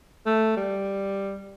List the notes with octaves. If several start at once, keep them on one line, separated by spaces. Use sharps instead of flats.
A3
G3